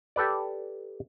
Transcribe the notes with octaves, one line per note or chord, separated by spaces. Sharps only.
G4 A4 B4 D5